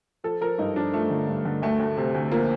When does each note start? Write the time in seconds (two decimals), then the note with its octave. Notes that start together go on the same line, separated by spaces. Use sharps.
0.24 F3 A4
0.41 F3 A#4
0.58 G2 D#4
0.75 F3 D4
0.93 F3 A3
1.10 D3
1.27 G2
1.45 D3
1.62 D2 A3
1.79 D2
1.97 C3
2.14 D2
2.32 F3 A#3